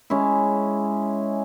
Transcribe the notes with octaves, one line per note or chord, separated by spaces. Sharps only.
G#3 C#4 E4